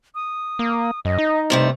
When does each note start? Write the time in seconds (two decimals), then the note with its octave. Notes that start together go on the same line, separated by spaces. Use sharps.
0.15 D#6
0.59 A#3
1.05 F#2 D#5
1.18 D#4
1.50 G2 C3 A3 C5